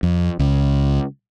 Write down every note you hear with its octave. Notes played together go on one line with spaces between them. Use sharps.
F2
C#2